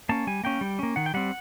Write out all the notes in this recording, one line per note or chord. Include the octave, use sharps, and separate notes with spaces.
A#3 C#4 A5
G3 G#5
A#3 C#4 G5
G3
A#3 C#4
D#3 F#5
G5
G3 C4 F#5